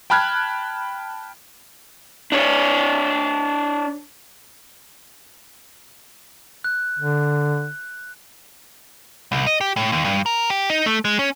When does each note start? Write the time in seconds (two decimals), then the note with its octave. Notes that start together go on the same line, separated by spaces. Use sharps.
0.10 G5 A5 B5 F6 F#6 G#6
2.32 D4 C#5
6.64 F#6
6.99 D3
9.32 C2
9.47 D#5
9.61 G4
9.76 A2
9.92 D#2
10.04 G2
10.26 A#4
10.50 G4
10.70 D#4
10.86 A3
11.05 G#3
11.19 C#4